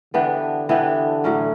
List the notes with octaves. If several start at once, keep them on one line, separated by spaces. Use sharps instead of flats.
D3 E3 B3 D4 G4
E3 B3 D4 G4
A2 F#3 C#4